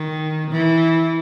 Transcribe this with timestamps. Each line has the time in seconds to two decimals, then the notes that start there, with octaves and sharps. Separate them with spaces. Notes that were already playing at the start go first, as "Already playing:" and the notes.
Already playing: D#3
0.51 E3